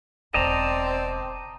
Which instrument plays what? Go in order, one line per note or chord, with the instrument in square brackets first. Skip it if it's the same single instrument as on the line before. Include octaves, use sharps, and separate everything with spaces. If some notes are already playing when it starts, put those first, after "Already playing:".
[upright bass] E1 B2 [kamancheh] C4 [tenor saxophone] D5 [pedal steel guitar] D#5 A5 A#5